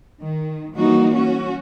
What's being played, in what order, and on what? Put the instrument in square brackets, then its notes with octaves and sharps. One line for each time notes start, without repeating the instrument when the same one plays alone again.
[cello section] D#3
E3 F#3 G3 A#3 D#4 F#4
C#4 F#4